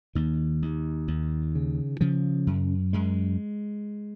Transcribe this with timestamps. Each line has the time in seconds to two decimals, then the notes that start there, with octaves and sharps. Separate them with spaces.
0.15 D#2 D#3
0.62 D#2
1.08 D#2
1.55 C#3
2.01 C#3 F3
2.47 F#2
2.93 F#2 G#3